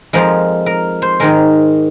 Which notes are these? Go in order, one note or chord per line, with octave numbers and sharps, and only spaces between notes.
F2 F3 G#3 A#4
A#4
C5
G#2 D#3 G#3 A#4